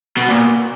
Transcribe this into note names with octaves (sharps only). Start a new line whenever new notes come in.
B2
A#2